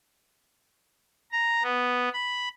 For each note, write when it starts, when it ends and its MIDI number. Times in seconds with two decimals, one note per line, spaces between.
1.32 1.63 82
1.63 2.09 59
2.13 2.49 83